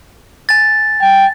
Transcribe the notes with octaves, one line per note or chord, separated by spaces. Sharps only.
G#5 A6
G5